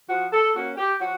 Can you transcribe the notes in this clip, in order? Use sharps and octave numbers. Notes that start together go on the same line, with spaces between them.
F3 F#4
A4
A#3 C#4 F#4
G4
F3 F#4